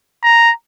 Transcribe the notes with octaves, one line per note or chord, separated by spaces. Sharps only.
A#5